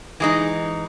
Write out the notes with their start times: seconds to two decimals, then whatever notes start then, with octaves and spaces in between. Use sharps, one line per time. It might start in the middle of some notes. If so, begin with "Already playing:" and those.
0.20 E3 G#3 D#4